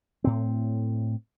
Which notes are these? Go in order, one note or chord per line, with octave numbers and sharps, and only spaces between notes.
A2 C4